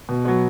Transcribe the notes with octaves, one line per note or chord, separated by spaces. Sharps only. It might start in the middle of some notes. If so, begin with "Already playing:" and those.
B2
F#3 B3